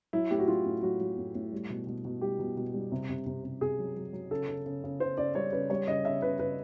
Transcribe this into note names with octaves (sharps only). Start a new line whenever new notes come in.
F#3 E4
A2 G4
F#4
F#3 F4
A2
F#3 F#4
F#3
A2
A2
G3
B2
B2
B2
G3 G4
B2
B2
G3
C3
C3
C3
C3
C3 G#4
F#3
F#3
F#3
C#3 A4
C#3
C#3
C#3
C#3 C5
C#3 D5
G3 C#5
C#3 B4
G3 C#5
C#3 D#5
C#3 E5
C#3 B4
C#3 B4